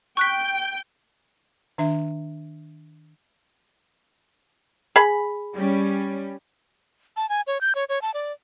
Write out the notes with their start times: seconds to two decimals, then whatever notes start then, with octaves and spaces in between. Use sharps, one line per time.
0.17 G5 C#6 F#6 B6
1.78 D#3 D4 E5
4.96 G#4 B5
5.55 G3 C#4
7.17 A5
7.29 G#5
7.47 C#5
7.61 G6
7.75 C#5
7.89 C#5
8.02 A5
8.14 D5